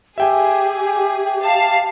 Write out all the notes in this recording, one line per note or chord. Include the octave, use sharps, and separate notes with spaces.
G4 G#4 E5 G5 G#5
F5 A5